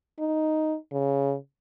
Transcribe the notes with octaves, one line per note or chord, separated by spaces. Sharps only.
D#4
C#3